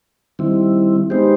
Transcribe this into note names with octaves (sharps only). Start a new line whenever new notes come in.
D#3 G3 C4 E4
G#3 B3 D#4 G4 C5